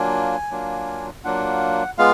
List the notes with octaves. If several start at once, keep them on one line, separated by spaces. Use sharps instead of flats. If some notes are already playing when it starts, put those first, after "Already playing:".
Already playing: F#3 A#3 D4 F4 G#5
F#3 A#3 D4 F4
F#3 A#3 D4 F4 F#5
G#3 B3 F4 F5